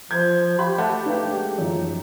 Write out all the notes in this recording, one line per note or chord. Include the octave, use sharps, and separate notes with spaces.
F3 G6 G#6
G4 F5 B5
A3 F#5 A5 F#6
D4 B4 F5
G#3
F#2 D#3 F3